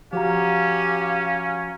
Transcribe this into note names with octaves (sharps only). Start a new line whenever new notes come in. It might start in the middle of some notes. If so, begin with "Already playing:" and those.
F3 C#4 F#4 G4 F5 A#5